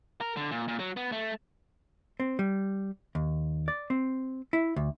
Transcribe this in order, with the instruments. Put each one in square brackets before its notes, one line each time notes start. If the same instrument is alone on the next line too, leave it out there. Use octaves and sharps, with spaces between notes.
[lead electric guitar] A#4
D3
A#2
A#2
F#3
B3
A3
[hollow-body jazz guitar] C4
G3
D#2
D5
C4
E4
D2